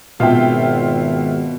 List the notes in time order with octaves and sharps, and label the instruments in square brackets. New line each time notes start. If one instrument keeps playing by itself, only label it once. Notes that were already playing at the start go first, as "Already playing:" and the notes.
[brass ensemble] G#1 [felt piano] B2 [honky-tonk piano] F4 E5 G5